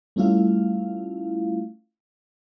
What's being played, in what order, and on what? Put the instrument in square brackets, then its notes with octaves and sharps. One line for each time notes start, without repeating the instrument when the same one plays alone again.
[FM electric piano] G3 A3 C#4 E4 F4 F5